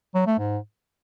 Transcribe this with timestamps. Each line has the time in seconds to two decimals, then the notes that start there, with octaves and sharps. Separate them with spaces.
0.15 F#3
0.26 A3
0.38 G#2